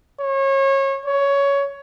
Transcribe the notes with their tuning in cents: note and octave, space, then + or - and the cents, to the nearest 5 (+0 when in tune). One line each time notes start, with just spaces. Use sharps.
C#5 -30
C#5 +15